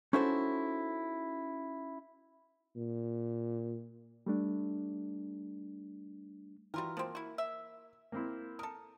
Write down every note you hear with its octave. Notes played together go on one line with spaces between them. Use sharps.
C#4 D#4 E4 F#4 A4 C5
A#2
G3 A3 D4
E3 G3 F4 F#4 A#4
F3 A#3 C4
E4 F#4
E5
A#3 C4 E4
A4 A#4 D#6